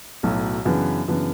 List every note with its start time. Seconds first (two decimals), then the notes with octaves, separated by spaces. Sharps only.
0.23 B1 A2 F#3
0.65 F#2 C#3 E3 B3 D4
1.08 F#2 C#3 E3 B3 D4